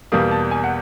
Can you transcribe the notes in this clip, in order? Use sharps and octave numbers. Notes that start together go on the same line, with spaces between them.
E2 B2 G3 A#3 D#6
A5
G#5
F#5